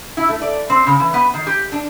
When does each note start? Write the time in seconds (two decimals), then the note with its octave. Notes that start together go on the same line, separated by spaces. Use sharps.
0.17 E4
0.29 A3
0.41 D5
0.70 C4
0.87 C#3
1.00 E3
1.14 B3
1.34 D#3
1.47 G4
1.72 D4